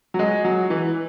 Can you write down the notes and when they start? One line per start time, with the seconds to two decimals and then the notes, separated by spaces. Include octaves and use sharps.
0.14 F#3
0.19 G#3
0.45 F#3
0.70 E3